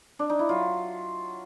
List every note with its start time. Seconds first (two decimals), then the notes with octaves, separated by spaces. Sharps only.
0.19 D4
0.29 D#4
0.39 E4
0.49 F#3 F4